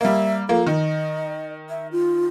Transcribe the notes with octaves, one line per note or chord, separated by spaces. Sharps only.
G3 A#3 E5
F3 A#3 A4
D#3 D#5
E5
F4